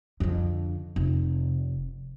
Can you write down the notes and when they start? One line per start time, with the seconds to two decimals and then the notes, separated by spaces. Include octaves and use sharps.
0.20 F2 D3
0.96 F1